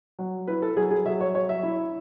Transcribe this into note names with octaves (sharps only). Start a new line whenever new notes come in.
F#3
E4 B4
A4
F#3 G#4
G#4
F#3 E5
C#5
F#3 C#5
E5
E4